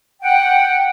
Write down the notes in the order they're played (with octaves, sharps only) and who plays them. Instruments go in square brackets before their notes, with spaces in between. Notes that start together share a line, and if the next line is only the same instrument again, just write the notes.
[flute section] F#5 G5